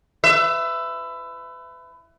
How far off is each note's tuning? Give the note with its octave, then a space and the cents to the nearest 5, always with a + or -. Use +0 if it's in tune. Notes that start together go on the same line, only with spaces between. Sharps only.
B4 +30 E5 +15